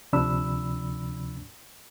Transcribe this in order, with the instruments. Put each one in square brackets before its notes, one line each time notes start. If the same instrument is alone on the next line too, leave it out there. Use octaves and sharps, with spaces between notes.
[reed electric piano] D2 C3 F3 D4 B5 E6